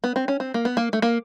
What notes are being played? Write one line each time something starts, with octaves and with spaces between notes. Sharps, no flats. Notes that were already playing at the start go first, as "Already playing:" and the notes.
B3
C4
C#4
C4
A#3
B3
A#3
A3
A#3